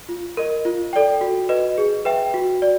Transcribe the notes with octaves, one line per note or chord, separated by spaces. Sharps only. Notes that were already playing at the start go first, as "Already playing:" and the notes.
F4
A#4 D#5
F4
A4 D5 G5
F#4
B4 D#5
G#4
B4 E5 G5
F#4
D5